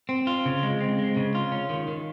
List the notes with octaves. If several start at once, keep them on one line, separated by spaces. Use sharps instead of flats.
C4
F4
C#3
G#3
C4
G#3
C#3
F4
C#4
D#3
D#3